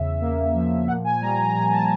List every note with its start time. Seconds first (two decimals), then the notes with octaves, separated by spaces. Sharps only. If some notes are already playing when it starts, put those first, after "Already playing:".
Already playing: E2 C#3 E5
0.21 A#3
0.54 F3
0.87 A#2 F#5
1.04 G#5
1.21 G3 A#5
1.38 A#5
1.54 A#2 A#5
1.72 A5